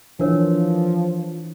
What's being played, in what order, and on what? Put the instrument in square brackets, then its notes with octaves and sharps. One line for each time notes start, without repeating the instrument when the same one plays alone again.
[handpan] E3 [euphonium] F3 [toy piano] D4 A#4 C#5